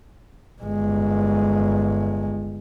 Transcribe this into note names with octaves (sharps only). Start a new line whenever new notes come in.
G1 G#3